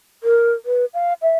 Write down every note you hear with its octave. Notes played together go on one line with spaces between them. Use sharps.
A#4
B4
F5
E5